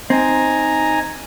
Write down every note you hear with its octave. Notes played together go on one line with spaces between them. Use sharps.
C4 D#4 G#5 A#5